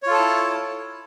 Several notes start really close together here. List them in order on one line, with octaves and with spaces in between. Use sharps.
C#5 F4 A4 A5 E4